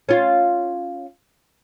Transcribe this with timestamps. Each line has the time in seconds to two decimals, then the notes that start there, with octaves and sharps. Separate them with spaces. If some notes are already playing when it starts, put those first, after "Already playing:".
0.09 C#4 F4